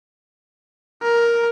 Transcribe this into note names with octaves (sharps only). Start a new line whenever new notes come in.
A#4